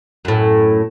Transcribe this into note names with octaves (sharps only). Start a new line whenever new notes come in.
F#2 A2